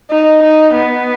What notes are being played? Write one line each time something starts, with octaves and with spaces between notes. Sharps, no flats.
D#4
D#4
B3